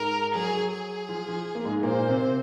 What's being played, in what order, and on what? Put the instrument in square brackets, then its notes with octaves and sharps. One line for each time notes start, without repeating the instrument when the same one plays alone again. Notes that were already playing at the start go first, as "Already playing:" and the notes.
Already playing: [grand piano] G#2 G#3 [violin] A#4
[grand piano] F#3 [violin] G#4
[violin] G#4
[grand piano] F3
F3
A#3
G#2 G#3
[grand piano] A#2 A#3 [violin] C5
[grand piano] C3 C4